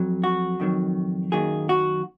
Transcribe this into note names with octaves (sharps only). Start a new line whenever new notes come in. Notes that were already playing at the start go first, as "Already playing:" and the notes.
Already playing: F2 F#3
F#4
F2 D#3 F#3
F#2 D#3 F#3 A#3 G#4
F#4